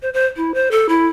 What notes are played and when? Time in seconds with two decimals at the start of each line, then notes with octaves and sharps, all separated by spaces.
0.02 C5
0.14 C5
0.37 E4
0.54 C5
0.71 A4
0.89 E4